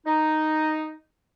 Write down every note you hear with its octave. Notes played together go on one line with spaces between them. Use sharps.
D#4